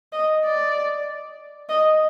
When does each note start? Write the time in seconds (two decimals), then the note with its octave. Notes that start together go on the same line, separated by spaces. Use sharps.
0.13 D#5
0.44 D5
1.69 D#5